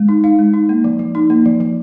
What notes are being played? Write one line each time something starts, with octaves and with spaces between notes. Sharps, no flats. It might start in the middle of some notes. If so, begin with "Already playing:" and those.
Already playing: G#3
D#4
D#4 F5
G#3
D#4
A#3
F3
F3
D#4
A#3
F3
F3